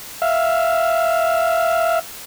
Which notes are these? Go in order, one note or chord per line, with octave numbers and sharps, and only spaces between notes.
E5 F5